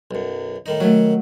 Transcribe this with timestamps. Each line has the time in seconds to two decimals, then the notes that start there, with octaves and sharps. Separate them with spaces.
0.11 B1 F#2
0.66 A2 D#3 D#4
0.80 D#3 F#3 A3 C#4